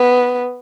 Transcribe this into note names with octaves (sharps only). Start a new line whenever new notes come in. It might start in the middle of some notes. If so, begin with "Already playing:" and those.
Already playing: B3